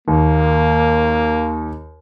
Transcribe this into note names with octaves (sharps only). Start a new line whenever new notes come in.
D#2 A#3